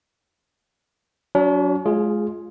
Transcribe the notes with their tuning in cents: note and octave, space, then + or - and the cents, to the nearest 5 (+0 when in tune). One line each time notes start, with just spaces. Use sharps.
F#3 +0 D4 -45
G#3 +35 F4 +0 G#4 +0